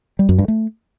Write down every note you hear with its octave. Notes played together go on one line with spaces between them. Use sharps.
G3
F#2
G2
A3